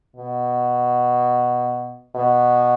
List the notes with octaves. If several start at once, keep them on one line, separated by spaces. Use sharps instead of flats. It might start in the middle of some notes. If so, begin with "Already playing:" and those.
B2
B2